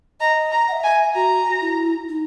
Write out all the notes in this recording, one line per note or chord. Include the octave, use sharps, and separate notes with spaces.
D#5 A#5
A#5
F#5
E5
G#5
F#4 A#5
E4
D#4